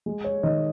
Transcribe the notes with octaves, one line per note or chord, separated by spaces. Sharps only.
G#3
C#5
D#3 D#5